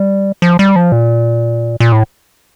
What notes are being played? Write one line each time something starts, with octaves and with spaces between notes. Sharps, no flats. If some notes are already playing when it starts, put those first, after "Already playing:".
Already playing: G3
F3
G3
F3
A#2
A#2
A2